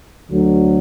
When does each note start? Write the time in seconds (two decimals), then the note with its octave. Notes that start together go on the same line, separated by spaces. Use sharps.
0.30 D2 D3 F#3